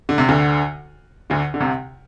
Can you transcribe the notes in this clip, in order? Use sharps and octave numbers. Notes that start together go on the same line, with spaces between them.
D3
C3
D2 D3
D2 D3
D3
C2 C3